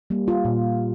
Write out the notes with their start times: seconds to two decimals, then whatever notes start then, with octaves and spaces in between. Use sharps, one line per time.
0.10 G3 A#3
0.28 F4
0.45 A#2